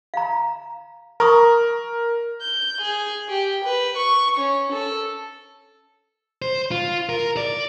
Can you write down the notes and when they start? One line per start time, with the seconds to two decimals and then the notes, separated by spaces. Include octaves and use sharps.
0.14 F5 A#5
1.20 A#4 A#5 C#6 D#6
2.42 G6
2.82 G#4
3.30 G4
3.65 B4
3.98 C#6
4.38 C#4
4.73 A4
6.42 C5
6.71 F4
7.09 A#4
7.37 D5